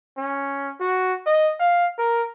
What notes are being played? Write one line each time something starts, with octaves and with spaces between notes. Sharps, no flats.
C#4
F#4
D#5
F5
A#4